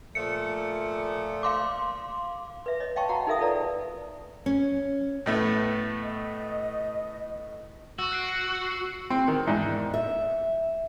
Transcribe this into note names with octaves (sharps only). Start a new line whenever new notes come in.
A#2 F3 A3 C#7
F5 C6 D6
B4 E5
C#5 D#5
D#5 F5 G5 A5 C#6
F#4 F#5 G5 A5 A#5
D#4 G#4 A#4 E5 F5 D#6
F4 A4 B4 D5 A#5
C#4
A2 A3 B3
D#5
F#4 C#6 E6
F#6 C7 D7
C#7
C7
C4
D#3
E2 G#2 D4
E5